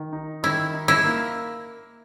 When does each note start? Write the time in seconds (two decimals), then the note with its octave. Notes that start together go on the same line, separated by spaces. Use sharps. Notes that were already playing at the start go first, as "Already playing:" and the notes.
Already playing: D#3
0.13 D#4
0.43 D#3 E4
0.74 D#4
0.88 E4
1.04 A#3